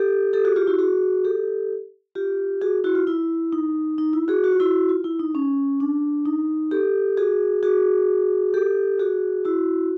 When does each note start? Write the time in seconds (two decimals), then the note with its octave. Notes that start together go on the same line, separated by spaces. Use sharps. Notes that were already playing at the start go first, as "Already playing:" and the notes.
Already playing: G4 A4
0.33 G4 A4
0.45 F#4 G#4
0.56 F4 G4
0.67 E4 F#4
0.79 F#4 G#4
1.25 G4 A4
2.15 F4 G4
2.62 F#4 G#4
2.84 E4 F#4
2.95 F4
3.07 E4
3.53 D#4
3.98 D#4
4.13 E4
4.28 F#4 G#4
4.44 F#4
4.52 F4
4.60 E4 F#4
4.89 F4
5.04 E4
5.19 D#4
5.35 C#4
5.80 D4
6.26 D#4
6.71 G4 A4
7.17 F#4 G#4
7.63 F#4 G#4
8.54 G4 A4
8.99 F#4 G#4
9.45 E4 F#4